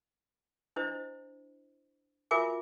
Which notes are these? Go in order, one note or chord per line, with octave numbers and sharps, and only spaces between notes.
D4 E4 C5 D#5
F4 F#4 A#4 E5 G#5 D6